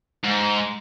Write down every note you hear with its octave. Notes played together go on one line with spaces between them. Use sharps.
G#2